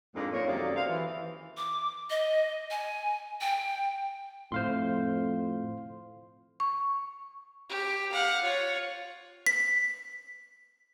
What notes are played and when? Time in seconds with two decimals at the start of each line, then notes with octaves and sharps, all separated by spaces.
0.15 F2 G#2 G#3 A#3 D4 F4
0.32 F3 A#3 D#4 F4 C#5
0.47 F#2 C3 D#3 A#3 A4 D5
0.76 C5 F5
0.89 E3
1.57 D6
2.10 D#5
2.71 G#5
3.41 G5
4.52 F2 A2 C5 F5 C6
6.60 C#6
7.69 G4
8.12 F5 F#5
8.43 F4 C#5
9.46 B6